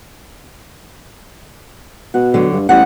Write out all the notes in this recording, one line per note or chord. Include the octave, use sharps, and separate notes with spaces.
B2 F#5
D3 F#3
G2
A1 E2 G3 F#5